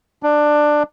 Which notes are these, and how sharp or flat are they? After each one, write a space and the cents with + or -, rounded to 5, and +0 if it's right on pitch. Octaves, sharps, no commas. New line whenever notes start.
D4 +15